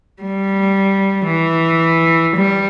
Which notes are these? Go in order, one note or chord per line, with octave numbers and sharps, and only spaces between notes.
G3
E3
G3